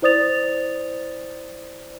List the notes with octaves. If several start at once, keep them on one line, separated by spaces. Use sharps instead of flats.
E4 C5 D5 D#6 A6 F7